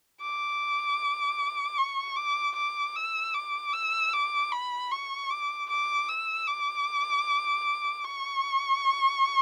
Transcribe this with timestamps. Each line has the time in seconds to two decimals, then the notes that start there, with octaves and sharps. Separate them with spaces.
0.22 D6
1.78 C#6
2.16 D6
2.56 D6
2.96 E6
3.34 D6
3.73 E6
4.13 D6
4.52 B5
4.91 C#6
5.30 D6
5.70 D6
6.09 E6
6.47 D6
8.04 C#6